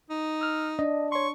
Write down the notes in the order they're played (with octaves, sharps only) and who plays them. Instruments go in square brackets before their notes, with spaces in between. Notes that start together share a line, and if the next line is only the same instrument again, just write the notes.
[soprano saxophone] D#4
[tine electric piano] E6 F6
[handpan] D4 [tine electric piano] D#5
[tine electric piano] C#5 C6 [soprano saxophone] C#6